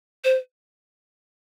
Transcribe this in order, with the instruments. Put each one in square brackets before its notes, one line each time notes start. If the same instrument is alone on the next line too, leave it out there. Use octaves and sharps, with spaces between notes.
[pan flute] C5